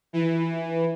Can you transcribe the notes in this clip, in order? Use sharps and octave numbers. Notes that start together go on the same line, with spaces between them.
E3